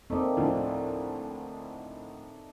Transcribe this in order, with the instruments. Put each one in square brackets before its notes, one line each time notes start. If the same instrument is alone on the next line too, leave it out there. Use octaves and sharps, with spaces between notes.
[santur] A3 D#4 D5 [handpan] A#3 C4
[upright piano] D2 A2 F3